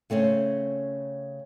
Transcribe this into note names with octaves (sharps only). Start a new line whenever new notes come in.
C#3 A3 C4 C#4